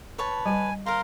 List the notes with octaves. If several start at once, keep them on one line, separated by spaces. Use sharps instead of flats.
B4 C#5 A5
G3 G#5
A#4 C5 F5 A#5 C6